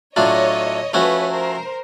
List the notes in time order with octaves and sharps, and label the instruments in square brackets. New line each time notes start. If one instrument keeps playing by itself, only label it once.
[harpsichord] A2 F#3 A3 D4 F4 [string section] C#5 D#5
[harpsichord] F3 A3 C#4 F#4 [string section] B4 C#5
[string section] A#4 C5